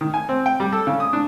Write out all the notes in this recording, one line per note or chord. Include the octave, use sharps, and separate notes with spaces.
D#3
G#5
C4
G5
G3
A4
C#3
D#6
D4